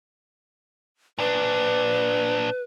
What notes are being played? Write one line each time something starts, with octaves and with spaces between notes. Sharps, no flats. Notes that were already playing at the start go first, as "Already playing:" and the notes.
A#2 D4 B4